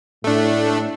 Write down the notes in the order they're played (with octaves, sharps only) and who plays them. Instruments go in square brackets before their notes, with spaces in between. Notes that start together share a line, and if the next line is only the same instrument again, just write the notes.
[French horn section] A2 [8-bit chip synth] A3 D4